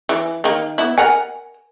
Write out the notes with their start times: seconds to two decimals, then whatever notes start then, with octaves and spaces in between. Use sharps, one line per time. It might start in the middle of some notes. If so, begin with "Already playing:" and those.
0.09 E3
0.44 D#3 A#3
0.78 B3 E4
0.98 A#4 F#5 G#5